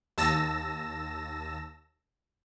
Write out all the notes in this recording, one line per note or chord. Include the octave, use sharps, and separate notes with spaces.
D#2 A5 E6 A#6 E7